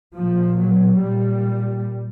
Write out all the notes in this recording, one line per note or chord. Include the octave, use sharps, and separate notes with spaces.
A#2 F3
F#3
A#2 G3